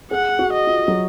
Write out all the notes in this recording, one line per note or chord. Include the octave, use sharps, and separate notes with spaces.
G#4 F#5
F#4
D#5
F4
F#3